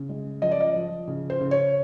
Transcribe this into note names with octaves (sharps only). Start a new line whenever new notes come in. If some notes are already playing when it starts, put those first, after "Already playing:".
Already playing: C#3
G#3
F3 D#5
D5
D#5
F3
C#3
C5
C#3
C#5